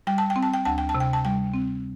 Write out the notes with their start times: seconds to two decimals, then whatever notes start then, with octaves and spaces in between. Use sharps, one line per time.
0.07 G3 G5
0.18 A5
0.30 G5
0.36 C4
0.43 A5
0.54 G5
0.65 D2 A5
0.78 G5
0.89 A5
0.95 C3
1.00 G5
1.13 A5
1.25 G3 G5
1.54 C4